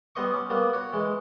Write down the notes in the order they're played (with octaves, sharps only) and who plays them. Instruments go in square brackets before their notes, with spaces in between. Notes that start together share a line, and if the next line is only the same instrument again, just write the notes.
[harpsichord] G3 B3 C5 D#5 C#6
C#4
G3 A#3 B3
F#4 C#5
E3 G#3